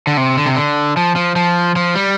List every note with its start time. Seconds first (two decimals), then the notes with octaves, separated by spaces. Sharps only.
0.07 D3
0.17 C3
0.37 D3
0.46 C3
0.56 D3
0.97 F3
1.16 F3
1.36 F3
1.76 F3
1.95 G3